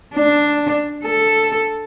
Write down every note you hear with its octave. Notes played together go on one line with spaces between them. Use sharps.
D4
A4